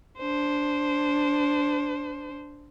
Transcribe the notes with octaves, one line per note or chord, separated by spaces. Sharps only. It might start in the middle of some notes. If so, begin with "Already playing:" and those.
D4 C5